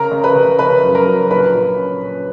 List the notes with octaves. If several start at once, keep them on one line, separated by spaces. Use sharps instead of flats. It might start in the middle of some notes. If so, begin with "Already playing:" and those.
Already playing: C#3 A#4 A#5
C#3
B4 B5
C#3
C#3 B4 B5
F#2
A#4 A#5
F#3
A#1 B4 B5
A#2
C#4
C#4